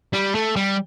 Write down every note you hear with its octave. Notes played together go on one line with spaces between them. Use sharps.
G3
A3
G3